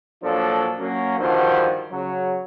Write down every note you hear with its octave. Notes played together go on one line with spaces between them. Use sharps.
A#2 F3 F#3 D4 F4 A4
F#3 A#3 C#4
G2 D3 D#3 F3 F#4 C5
C#3 F#3